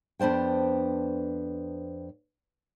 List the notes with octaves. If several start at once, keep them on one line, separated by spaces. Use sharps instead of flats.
F2 B3 D4 C5 G5